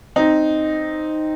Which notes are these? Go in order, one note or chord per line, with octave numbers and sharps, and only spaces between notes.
C4 D#4